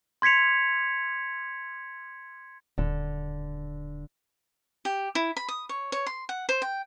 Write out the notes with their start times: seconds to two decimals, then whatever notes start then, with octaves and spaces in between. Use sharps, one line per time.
0.22 C6 G#6 B6 C#7 F7
2.78 D#1 D3
4.85 G4
5.15 E4
5.37 B5
5.49 D#6
5.69 C#5
5.92 C#5
6.07 C6
6.29 F#5
6.49 C5
6.62 G5